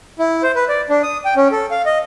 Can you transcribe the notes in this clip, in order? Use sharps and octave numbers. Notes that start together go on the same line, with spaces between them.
E4
C5
B4
D5
D4
D#6
G5
C#4
A4
F5
D#5